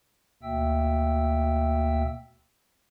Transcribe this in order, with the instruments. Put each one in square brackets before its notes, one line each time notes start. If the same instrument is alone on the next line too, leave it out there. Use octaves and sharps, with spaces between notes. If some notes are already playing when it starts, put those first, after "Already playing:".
[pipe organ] D2 B2 A#3 E5 G5 E6